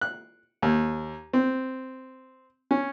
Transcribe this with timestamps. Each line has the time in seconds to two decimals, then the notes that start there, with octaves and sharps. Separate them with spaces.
0.01 F#6
0.62 D#2
1.33 C4
2.71 C#4